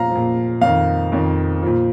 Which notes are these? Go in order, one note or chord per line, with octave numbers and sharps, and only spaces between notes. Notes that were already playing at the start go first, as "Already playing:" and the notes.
Already playing: A#2 F3 F5 A#5
F3
A#2
F2 D#3 F5
F2 D#3
A#2 F3